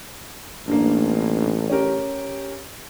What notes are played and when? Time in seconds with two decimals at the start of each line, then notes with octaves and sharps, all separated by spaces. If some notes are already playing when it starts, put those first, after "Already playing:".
0.68 A1 G2 A#3
1.69 C#4 G4 A#4